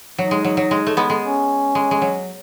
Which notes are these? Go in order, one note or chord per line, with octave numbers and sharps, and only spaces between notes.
F#3 D#4
G#3
F#3
F#3
G#3
A3
G#3 B3
G#3
C#4
G#3
G#3
F#3